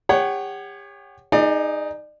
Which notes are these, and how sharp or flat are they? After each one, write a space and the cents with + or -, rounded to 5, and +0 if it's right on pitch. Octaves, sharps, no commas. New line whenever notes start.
G4 +40 C#5 +0 F#5 +25
D#4 +0 G#4 +0 D5 +35